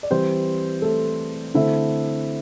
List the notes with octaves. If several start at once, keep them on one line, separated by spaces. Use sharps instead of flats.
D5
E3 G3 C4 C5
A3 A4
D3 A3 C4 E4